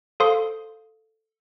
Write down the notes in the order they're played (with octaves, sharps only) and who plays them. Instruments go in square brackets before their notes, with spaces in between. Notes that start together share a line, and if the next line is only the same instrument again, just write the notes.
[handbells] A4 C5 F5 C6 D#6